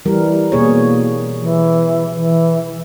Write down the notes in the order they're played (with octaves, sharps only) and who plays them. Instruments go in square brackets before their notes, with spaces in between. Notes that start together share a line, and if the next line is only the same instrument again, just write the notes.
[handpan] E3 G3 A#4
[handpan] B2 G#4 C#5 [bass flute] A#3
[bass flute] E3
E3